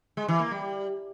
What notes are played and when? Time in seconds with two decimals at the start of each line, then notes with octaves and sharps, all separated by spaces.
0.17 G#3
0.28 E3
0.40 A#3
0.51 G3